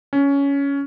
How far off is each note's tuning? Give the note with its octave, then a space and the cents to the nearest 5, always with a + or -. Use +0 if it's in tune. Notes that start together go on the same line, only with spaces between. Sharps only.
C#4 +15